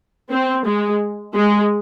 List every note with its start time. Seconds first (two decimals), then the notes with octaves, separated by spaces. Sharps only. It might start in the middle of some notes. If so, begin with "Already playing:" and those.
0.30 C4
0.65 G#3
1.36 G#3